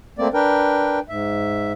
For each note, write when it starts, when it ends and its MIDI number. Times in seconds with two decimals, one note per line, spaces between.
0.19 0.28 57
0.19 0.28 58
0.19 0.28 60
0.19 0.28 74
0.34 0.99 62
0.34 0.99 70
0.34 0.99 71
0.34 0.99 79
1.09 1.72 44
1.09 1.72 76